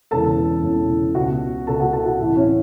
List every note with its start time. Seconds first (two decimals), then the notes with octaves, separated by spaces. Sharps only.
0.11 E1 E2 C#3 E3 A4 A5
0.63 E1 E2 C#3 E3
1.15 C#2 B2 F#4 F#5
1.67 C#2 B2 A4 A5
1.80 F#4 F#5
1.93 A4 A5
2.06 F#4 F#5
2.19 A1 A2 E3 E4 E5
2.36 C#4 C#5